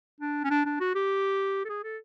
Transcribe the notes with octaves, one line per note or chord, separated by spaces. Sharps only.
D4
C#4
D4
D4
F#4
G4
A4
G#4
A4